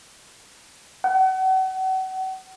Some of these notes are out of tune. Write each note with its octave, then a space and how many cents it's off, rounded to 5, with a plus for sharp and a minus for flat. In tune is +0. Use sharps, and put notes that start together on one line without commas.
F#5 +35